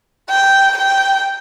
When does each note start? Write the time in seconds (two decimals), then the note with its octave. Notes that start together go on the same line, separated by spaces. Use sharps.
0.30 G5
0.77 G5